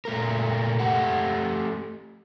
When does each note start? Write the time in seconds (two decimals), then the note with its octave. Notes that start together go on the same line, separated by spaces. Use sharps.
0.05 A#2 A3 A#4
0.80 A3 G4 F#5